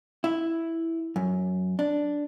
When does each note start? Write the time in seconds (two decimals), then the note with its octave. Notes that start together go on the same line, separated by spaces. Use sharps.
0.24 E4
1.16 F#2
1.79 D4